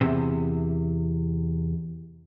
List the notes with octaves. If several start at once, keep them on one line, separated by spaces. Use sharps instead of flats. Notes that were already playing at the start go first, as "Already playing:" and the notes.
E2 C3